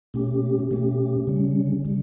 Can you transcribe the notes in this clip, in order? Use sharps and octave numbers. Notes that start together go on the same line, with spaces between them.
B2 A3 C#4 G4
B2 A3 C#4 G4
C#3 G3 C#4
C#3 G3